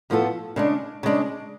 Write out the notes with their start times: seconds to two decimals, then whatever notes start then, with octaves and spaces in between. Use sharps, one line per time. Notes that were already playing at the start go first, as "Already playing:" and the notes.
0.10 A2 F3 B3 F4 A4
0.56 C#3 G#3 D4
1.03 C#3 G#3 D4